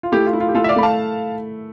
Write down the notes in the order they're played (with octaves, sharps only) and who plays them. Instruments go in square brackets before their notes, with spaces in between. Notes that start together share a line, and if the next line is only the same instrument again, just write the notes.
[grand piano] F4
[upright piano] A3 [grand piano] E4 G4
[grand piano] F4
[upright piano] E4
[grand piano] F4
G4
[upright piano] A3 [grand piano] F4 A4
[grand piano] E5
D5 F5
[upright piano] A3 [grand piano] B5
[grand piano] F5 A5